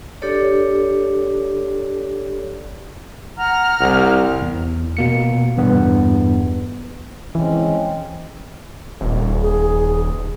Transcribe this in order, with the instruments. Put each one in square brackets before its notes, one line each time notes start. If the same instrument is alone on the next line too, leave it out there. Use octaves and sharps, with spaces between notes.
[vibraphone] D4 G4 A4 C#5 D5
[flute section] F#5 A#5 F6
[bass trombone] C2
[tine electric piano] E2
B2 A#3 C#7
E2 G2 B3
[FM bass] E3 [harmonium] G#3 C4 C#4
[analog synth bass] D#1
[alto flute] G#4